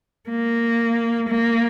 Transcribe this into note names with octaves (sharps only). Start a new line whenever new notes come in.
A#3
A#3